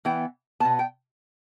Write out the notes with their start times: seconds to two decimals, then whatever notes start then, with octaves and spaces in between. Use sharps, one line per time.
0.05 E3 B3 G5
0.60 B3 A5
0.65 B2
0.79 G5